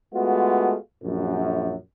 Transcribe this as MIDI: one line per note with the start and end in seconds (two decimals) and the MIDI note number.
0.14 0.74 56
0.14 0.74 57
0.14 0.74 59
0.14 0.74 65
0.14 0.74 66
1.02 1.75 34
1.02 1.75 42